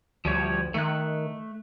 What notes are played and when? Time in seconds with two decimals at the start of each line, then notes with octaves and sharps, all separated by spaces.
0.25 D2 F3 G3 C#5
0.74 D#3 A3 F#6